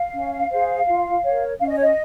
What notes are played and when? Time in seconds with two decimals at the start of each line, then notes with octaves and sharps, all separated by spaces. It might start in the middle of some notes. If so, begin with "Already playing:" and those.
Already playing: F5
0.14 C#4
0.51 G#4 C5
0.87 F4
1.24 A#4 C#5
1.60 C#4 F5
1.68 D#5
1.76 C#5
1.82 D#5